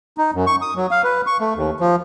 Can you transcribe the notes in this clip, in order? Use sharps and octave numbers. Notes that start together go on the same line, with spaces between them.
D#4
F#2
C#6
D#6
F#3
F5
B4
C#6
A3
D#2
F3